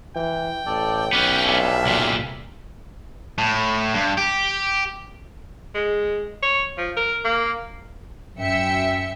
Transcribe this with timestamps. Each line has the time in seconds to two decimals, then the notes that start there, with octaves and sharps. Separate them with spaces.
0.16 E3 G5
0.66 A1 A4 D5
1.13 B1 B3 C#4 F#5 D6
1.46 G3 D4 E5 F5 G#5
1.85 C2 A#2
3.38 A2
3.93 G2
4.17 G4
5.75 G#3
6.42 C#5
6.78 F3
6.96 A#4
7.24 A#3
8.38 F#2 E5 G5 C#7